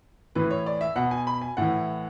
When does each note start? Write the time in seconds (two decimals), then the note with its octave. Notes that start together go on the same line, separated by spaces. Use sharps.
0.35 A2 E3 B4
0.51 C#5
0.66 D5
0.81 E5
0.96 B2 F#5
1.11 G#5
1.27 B5
1.41 G#5
1.57 A2 E3 F#5